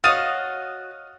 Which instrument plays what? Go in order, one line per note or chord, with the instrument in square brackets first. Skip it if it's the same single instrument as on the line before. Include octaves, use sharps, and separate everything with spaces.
[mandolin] F#4 [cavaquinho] C#5 D#5 F5 [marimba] D#6 [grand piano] F6 A6 D#7